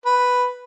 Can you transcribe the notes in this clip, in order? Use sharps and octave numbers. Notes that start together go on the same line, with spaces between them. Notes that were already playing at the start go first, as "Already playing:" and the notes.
B4